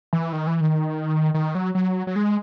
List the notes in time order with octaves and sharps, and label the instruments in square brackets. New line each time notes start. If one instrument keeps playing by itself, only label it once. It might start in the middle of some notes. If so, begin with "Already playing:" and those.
[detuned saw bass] E3
D#3
E3
D#3
D#3
F#3
F#3
F#3
G#3